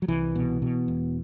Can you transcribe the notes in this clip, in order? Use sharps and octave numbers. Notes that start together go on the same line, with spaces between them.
F#3
C2 E3
B2
B2
E1